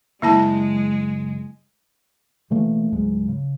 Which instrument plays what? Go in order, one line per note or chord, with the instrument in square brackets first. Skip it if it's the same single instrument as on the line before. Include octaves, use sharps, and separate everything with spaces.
[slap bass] F#1 [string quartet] G#3 [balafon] A#3 E4 A5
[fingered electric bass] B2 E3 A3 A#3
C#2 G#2 F#3 G#3
C#3